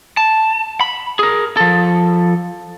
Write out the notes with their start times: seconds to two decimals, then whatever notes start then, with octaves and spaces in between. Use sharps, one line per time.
0.17 A5
0.81 B5
1.19 G#4 A#4
1.57 F3 A4